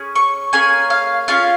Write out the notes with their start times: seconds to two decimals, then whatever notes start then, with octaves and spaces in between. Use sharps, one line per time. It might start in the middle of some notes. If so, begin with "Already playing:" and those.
Already playing: C#4 G#4
0.15 C#6
0.53 A#3 C#4 G#4 G#5
0.90 F5
1.28 C#4 F4 G#4 F5